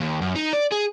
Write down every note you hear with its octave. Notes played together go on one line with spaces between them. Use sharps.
D#2
F#2
D#4
D5
G#4